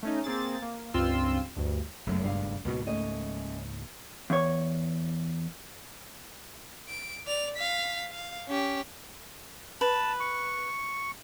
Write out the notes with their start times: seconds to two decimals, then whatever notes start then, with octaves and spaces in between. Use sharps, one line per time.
0.03 A3 C#4 D#4
0.24 A#3 C4 G#4 A6
0.62 A#3
0.94 C#2 G2 C4 F4 C6 E6
1.56 D2 G2
2.07 F#1 B1 F#2 G#3 A3
2.22 G2 F5
2.65 C#2 G#2 B2 A#3 F#4
2.87 A3 C#4 D#5
4.30 E2 C#5
6.89 D7
7.27 D5 F7
7.56 F5 B6
8.11 F5
8.48 C#4 G4
9.81 B4 A5
10.20 C#6